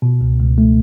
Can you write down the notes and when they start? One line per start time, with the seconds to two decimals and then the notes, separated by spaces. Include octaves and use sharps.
0.02 B2
0.21 C#2
0.39 C#2
0.58 A3